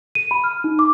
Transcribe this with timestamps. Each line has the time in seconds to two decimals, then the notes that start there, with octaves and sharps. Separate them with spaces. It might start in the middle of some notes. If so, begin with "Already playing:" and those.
0.15 D#7
0.31 B5
0.44 F6
0.64 D#4
0.79 D6